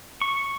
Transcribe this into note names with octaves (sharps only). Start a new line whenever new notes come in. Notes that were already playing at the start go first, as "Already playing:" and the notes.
C#6